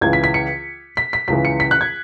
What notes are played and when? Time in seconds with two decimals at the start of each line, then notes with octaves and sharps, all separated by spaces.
0.01 C#2 C#3 E3 G#6
0.13 B6
0.24 B6
0.34 C#7
0.97 B6
1.13 B6
1.28 C#2 C#3 E3 B6
1.45 C#7
1.60 B6
1.71 F#6
1.81 G#6